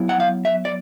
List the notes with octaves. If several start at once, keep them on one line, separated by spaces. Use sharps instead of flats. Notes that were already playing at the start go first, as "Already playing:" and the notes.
Already playing: F#3 B3 E4
F#5
F5
E5
D5